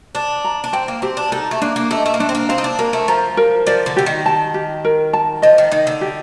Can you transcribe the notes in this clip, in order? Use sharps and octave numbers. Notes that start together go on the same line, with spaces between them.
D4 D5
A#5
D4
C4 G5
A#3
C4 G4
D4
D#4 A4
A3
A#3 D4
A#3
A3 D#5
A3
A#3
A3 D4
C4
A#3
C4 F5
D#4
D4
A#3 A#4
A3
F3 A#5
A#4
F3 D5
D3
D3 G4
D#3
A5
G4
A#4
A5
F3 D#5
D#3
D#3 D#4
D3
G4